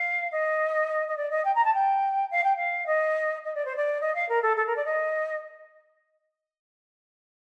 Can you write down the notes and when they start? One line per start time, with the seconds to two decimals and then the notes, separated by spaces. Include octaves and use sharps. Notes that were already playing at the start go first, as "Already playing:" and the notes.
Already playing: F5
0.32 D#5
1.08 D#5
1.17 D5
1.31 D#5
1.45 G5
1.55 A#5
1.65 A5
1.74 G5
2.31 F5
2.44 G5
2.56 F5
2.87 D#5
3.44 D#5
3.55 D5
3.65 C5
3.77 D5
4.01 D#5
4.15 F5
4.29 A#4
4.43 A4
4.57 A4
4.67 A#4
4.77 D5
4.85 D#5